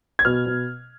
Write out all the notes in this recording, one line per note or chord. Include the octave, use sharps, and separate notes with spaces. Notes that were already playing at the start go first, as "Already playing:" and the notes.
G#6
B2 F6
B2